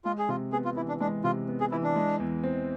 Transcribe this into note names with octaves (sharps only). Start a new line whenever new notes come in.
G#3 F4
G#4
C3 F4
B3 G#4
F4
E3 E4
D4
G#3 D4
C3 F4
B3
G#4
E3 E4
D4
G#3
E2
C4